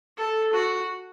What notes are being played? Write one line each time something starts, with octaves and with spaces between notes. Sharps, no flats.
A4
F#4